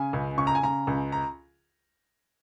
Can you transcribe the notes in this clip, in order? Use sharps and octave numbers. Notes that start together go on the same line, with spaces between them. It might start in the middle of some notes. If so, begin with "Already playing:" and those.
Already playing: C#3 G#5
C#2
C#3 C#6
A#5
G#5
C#3 A#5
C#2
A#5